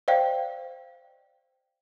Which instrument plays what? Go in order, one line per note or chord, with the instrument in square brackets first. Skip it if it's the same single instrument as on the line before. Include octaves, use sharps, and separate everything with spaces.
[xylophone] C5 D5 D#5 F5 G5